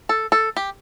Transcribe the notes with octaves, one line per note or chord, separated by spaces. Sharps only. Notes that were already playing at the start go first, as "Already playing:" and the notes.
A4
A4
G4